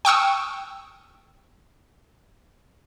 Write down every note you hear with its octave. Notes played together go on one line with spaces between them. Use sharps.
G5 C#6 D#6 E6